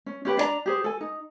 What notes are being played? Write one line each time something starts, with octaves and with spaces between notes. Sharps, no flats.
C#4
C#4 G4 B4 G5
D4 C#5 D5 A#5
G4 G#4 C5
A4 G#5
D#4